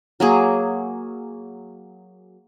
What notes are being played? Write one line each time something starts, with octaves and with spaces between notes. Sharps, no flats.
F#3 A#3 G#4